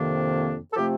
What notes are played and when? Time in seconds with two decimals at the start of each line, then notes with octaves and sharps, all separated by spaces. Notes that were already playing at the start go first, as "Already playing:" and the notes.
Already playing: F2 C3 D#3 A#3 D4
0.72 A4
0.76 C3 F3 A3 C4 G4